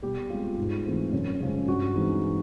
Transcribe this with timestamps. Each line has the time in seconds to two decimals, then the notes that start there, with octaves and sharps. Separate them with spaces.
0.02 B2 G3 G4
0.30 G#3 C4 F4
0.57 G#2
0.86 E3 A3 C4
1.13 F#2
1.40 C#3 F3 G#3
1.68 G2 F#4
1.95 E3 G#3 C4 D#4